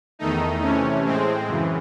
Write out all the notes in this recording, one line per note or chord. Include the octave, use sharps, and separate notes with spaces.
E2 D#3 A3 D#4
C3 E3 A3 C#4
A2 G#3 C4
F#2 C#3 E3